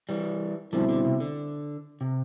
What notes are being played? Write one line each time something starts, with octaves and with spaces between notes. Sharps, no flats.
E3 G3
B2 D3 F3 G3 C4 E4
D3
C3
D3
C3